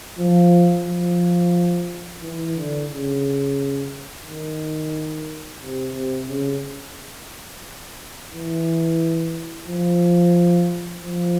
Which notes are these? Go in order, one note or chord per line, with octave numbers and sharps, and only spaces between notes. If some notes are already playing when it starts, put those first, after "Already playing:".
F3
F3
E3
D3
C#3
D#3
C3
C3
C#3
E3
F3
F3